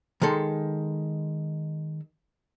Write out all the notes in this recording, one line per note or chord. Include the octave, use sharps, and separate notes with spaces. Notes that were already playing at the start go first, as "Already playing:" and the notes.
D#3 G#3 A4 C6